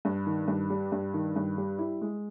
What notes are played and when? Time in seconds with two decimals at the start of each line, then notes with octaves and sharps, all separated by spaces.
0.05 G2
0.26 D#3
0.48 G2
0.70 G3
0.92 G2
1.14 D#3
1.36 G2
1.58 G3
1.79 E4
2.01 G#3